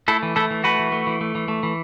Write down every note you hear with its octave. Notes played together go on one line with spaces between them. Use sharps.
A3 E4 A4
E3
A3 E4 A4
E3
A3 F#4 B4
E3
A3
E3
A3
E3
A3
E3